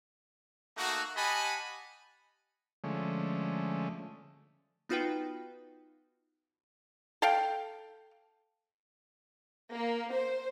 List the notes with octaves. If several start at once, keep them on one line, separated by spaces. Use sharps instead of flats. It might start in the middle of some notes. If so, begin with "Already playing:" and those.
A3 A#3 D#4 F#4
G4 D#5 F#5 G#5 A5 B5
D3 F3 G#3 A3 C#4
B3 D#4 F4 F#4 B4 G5
A4 F5 G5
A#3
C5